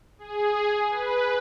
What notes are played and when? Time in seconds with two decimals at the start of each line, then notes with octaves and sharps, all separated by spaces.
0.19 G#4
0.90 B4